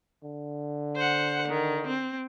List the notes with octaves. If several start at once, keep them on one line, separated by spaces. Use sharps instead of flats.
D3
C5 F#5
D#3
C4